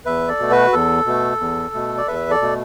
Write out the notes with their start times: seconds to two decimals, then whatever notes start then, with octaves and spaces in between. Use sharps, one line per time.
0.05 E2 B4 E5
0.28 A4 D5
0.39 B2 A3
0.51 F#4 B4
0.73 E2 A4
1.06 B2 A3
1.40 E2
1.74 B2 A3
1.97 D5
2.08 E2 B4 E5
2.30 A4 D5
2.41 B2 A3